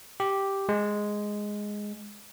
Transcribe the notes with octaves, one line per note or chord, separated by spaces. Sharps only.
G4
G#3